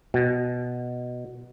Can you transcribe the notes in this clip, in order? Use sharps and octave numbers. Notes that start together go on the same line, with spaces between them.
B2